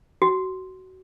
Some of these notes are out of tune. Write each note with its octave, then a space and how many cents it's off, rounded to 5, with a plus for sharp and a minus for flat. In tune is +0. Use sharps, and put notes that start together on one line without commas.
F#4 +20